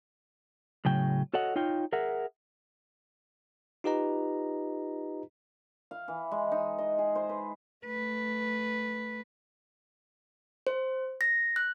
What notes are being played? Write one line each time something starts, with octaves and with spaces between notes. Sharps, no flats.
A2 C#3 F#3 G5
F#4 A4 C#5 D#5 F#5
D#4 F4 C#5 G5
G#4 A#4 E5 F#5
D#4 F4 G4 B4 D#5 A#5
F5
E3
G#3
D#4
D#5
G#4
C5
B4
A3 B4
C5
A#6
F#6